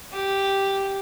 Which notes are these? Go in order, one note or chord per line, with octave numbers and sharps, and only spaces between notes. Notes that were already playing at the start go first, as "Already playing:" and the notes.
G4